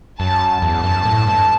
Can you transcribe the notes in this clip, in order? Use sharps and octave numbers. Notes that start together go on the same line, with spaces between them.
F#2 A5
E2 A5
F#2
A2
G2